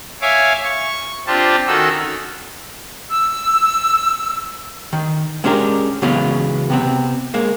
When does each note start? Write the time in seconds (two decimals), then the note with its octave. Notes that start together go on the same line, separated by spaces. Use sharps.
0.21 C#5 E5 F5 G#5 D6
0.64 C#6
1.27 C4 D4 F4 G4 A5
1.67 D#3 C#4 D#4 F#4 A4 E6
3.09 E6
4.93 D#3
5.44 G#3 C#4 D4 G4 A#4
6.02 C#3 E3 F#3 G#3 B3 C#4
6.70 C3 B3 C4
7.34 G#3 A#3